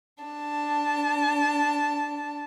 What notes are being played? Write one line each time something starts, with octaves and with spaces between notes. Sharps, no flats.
D4 A5